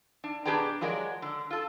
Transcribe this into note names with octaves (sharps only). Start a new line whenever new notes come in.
D4
B2 D4 G4 G#4 D5 A#5
F3 F#3 G#3 A#4 D5
D3
F4 A4